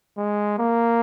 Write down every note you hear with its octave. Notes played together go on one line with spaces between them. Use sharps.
G#3
A#3